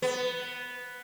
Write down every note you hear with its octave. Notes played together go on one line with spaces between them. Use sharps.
B3